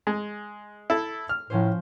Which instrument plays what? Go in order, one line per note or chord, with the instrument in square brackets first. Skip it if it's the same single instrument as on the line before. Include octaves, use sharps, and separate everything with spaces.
[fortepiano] G#3
E4 A4
F6
[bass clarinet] A2 [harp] F3 C#4 C5